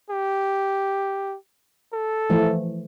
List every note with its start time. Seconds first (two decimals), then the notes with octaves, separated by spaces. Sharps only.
0.10 G4
1.93 A4
2.30 E3 F3 A3